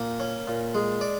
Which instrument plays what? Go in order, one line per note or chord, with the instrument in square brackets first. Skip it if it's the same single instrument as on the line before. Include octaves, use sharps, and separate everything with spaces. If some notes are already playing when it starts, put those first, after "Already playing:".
Already playing: [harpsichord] A#2 A#3
C#4
A#2
G#3
D5